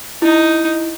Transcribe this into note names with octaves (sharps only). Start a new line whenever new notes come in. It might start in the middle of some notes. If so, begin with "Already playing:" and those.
D#4 E4